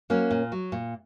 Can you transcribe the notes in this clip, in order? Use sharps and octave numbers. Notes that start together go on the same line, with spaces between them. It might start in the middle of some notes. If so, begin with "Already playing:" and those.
F#3 A#3 C#4
A#2
F#3
A#2